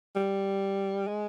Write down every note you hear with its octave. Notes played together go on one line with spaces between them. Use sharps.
G3
G#3